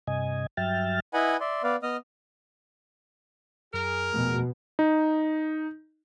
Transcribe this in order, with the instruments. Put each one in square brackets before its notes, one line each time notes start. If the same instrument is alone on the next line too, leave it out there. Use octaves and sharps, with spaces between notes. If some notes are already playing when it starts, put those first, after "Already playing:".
[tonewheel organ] G2 C3 D#5 G#5
G2 F#3 E5 G5 F6 A6
[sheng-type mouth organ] E4 B4 D#5 F#5 G#5 B5
D5 E5 C6
B3 B4 D5 F5
B3 D#5 D#6 F6
[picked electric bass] F#2 [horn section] G#4 A#4
[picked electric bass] E1 F3 A3 [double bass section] B2
[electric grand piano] D#4